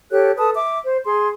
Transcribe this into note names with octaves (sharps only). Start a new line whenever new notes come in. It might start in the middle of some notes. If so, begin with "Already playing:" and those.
G4 A4 C#5 F#6
A4 B4 A5 D#6
E5 D6
C5
G#4 C6